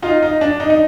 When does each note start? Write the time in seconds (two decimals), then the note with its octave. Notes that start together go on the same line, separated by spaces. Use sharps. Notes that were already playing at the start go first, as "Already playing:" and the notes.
0.02 D#4 F4
0.23 D#4
0.41 D4
0.60 D#4
0.70 D#4